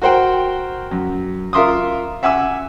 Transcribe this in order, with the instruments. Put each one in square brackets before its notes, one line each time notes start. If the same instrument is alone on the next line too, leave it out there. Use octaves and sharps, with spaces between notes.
[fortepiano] F#4 A#4 C5 F#5 G5
F#2
F4 A#4 E5 C6 D6 D#6
E5 F#5 G#5 D6 E6